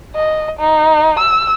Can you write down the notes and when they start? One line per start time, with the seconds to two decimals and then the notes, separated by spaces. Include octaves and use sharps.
0.16 D#5
0.59 D#4
1.19 E6